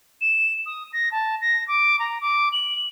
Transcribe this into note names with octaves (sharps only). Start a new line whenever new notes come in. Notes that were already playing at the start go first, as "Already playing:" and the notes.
E7
D#6
A#6
A5
A#6
D6
A#5
D6
F#7